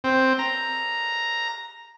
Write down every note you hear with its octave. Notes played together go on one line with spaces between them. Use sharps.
C4
A#5